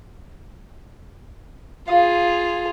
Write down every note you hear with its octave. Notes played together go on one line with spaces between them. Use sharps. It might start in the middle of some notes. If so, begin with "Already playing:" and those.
F4 G#4 F5 B5 D#6